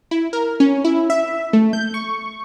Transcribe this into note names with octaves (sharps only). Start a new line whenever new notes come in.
E4
A#4
C#4
E4
E5
A3
G6
C#6